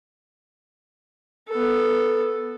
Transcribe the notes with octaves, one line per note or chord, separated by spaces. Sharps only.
B3 A4